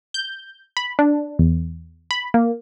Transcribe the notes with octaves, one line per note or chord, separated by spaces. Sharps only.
G6
B5
D4
E2
B5
A#3